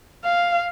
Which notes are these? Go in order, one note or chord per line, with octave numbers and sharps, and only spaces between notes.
F5